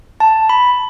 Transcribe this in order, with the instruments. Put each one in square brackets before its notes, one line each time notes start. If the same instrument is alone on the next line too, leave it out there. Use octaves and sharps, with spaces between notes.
[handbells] A5
B5